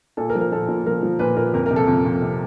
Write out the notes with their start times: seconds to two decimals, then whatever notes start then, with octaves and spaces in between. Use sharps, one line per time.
0.17 A#2 A4
0.30 A#4
0.35 F3
0.41 A#4
0.52 A#2 A4
0.68 A#2
0.86 F3 A#4
1.03 F3
1.19 A#2 B4
1.37 A#2 A#4
1.54 F2 A#4
1.66 C3 A#4
1.76 A4
1.87 F2
2.05 F2
2.22 C3